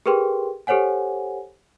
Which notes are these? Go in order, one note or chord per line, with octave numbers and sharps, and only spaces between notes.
G4 G#4 A#4 B4 G5 C6
G4 A4 C5 C#5 F#5 G#5